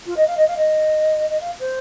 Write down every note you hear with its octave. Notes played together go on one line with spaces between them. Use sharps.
F4
D#5
F5
D#5
F5
D#5
D#5
F5
C5